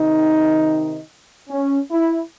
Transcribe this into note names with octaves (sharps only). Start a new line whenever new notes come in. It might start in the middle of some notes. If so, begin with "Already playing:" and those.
Already playing: C3 D#3 D#4
C#4
E4